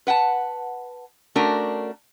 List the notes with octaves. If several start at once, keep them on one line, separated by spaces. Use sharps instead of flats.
B4 F#5 G5 A5
A3 C#4 D4 F#4 A#4